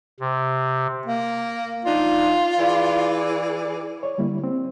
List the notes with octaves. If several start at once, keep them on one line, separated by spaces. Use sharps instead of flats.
C3
A#3
F3 D4 D#4 F4
E3 G#4 D5
C#5 D5
D3 G3 A#3 E4
C4